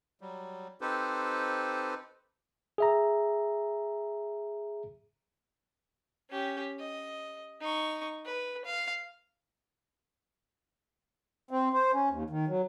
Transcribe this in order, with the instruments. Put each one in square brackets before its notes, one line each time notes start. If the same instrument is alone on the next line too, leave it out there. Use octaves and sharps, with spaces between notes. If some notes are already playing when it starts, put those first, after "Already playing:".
[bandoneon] F#3 G3
C4 D#4 G4 A4 B4 C5
[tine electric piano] G#4 E5 A#5
[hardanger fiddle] C#4 G4
D#5
D#4 C#6
B4
F5
[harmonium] C4
C5
C#4
D#2
D#3
F#3